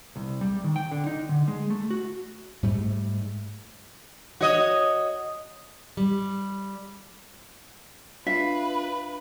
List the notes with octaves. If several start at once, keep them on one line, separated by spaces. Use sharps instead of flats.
C2
G3
D#3
G5
D3
D#4
D3
G#3
A3
F#4
G#2 G3 A3
F#4 C#5 D#5
G3
D4 F4 B4 E5 F5